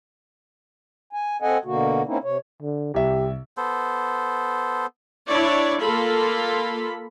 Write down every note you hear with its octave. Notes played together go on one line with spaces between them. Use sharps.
G#5
C4 A4 D#5 F#5 G#5
B2 D3 A#3 F#4
A#3 C4 C#4 D#4 E4
C3 C#5
D3
C2 G4 E5
B3 A4 C5
D4 E4 C#5 D5
A#3 F4 A4 B5